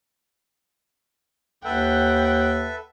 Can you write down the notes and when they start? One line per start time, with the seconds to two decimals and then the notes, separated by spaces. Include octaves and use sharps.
1.65 D#2 A4 B4 E5 F#5 G5